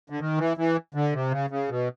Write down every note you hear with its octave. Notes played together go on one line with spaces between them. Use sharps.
D3
D#3
E3
E3
D3
C3
C#3
C#3
B2